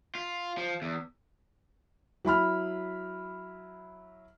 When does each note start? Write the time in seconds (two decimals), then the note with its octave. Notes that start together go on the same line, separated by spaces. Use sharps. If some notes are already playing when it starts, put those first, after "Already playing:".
0.15 F4
0.58 F3
0.82 E2
2.25 F#3 E4 B5 F6